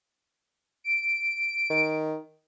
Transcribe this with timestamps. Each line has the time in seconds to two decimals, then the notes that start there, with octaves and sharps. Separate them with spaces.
0.84 D7
1.70 D#3